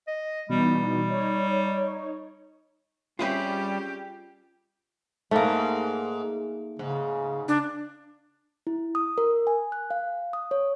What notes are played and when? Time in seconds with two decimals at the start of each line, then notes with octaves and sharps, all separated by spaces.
0.07 D#5
0.49 B2 E3 G3 D#4
1.08 D#4 C#5
3.19 G3 C4 C#4 F4 G4 G#4 B4 E5
5.31 G#2 A3 A#3
6.79 G#2 C#3
7.48 D4
8.67 E4
8.95 D#6
9.18 A#4
9.47 G#5
9.72 F#6
9.91 F5
10.33 D#6
10.51 C#5